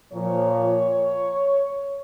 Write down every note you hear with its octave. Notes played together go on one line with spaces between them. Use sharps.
A#2 F3 C#5